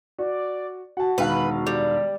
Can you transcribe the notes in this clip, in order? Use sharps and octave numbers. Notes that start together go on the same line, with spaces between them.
F#4 D5
F#4 F#5 A5
E1 D#3 B4 F5
G3